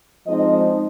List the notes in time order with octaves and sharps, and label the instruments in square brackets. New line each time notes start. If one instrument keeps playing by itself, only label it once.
[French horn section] F3 G#3 C4 D#4 D#5